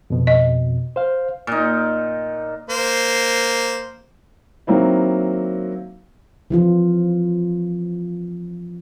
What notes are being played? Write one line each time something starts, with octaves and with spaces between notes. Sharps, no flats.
F2 B2
D#5
C5 F5
A#2 D#4
A#3 C5
D#3 F#3 A#3 C4 E4
E3 F3 F4